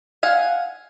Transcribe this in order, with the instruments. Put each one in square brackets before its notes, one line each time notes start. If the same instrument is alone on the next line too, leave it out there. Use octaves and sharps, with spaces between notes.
[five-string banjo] F5 F#5 G#5